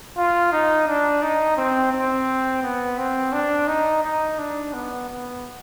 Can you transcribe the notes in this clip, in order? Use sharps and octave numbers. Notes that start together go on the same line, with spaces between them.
F4
D#4
D4
D#4
C4
C4
B3
C4
D4
D#4
D#4
D4
B3
B3